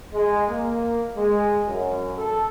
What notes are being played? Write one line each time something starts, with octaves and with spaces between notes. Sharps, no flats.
G#3
A#3
G#3
F#2
A4